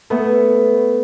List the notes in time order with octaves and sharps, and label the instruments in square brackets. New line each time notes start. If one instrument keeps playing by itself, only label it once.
[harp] A3 B3